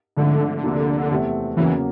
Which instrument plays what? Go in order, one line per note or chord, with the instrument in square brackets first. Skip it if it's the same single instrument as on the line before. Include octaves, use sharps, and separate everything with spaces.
[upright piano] G#2 F3 A3 C4 [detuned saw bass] D3
[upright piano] D2 C3 F3 A#3 D4
E2 C3 E3 A3 C4
[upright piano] E2 C#3 F#3 A#3 C#4 [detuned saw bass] E3